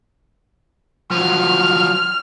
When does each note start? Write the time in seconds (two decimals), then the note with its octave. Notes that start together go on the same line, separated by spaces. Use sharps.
1.11 F3 F#3 F6